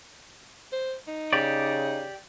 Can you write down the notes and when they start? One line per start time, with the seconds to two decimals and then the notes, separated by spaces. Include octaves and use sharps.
0.72 C5
1.07 D#4
1.33 C#3 G4 D5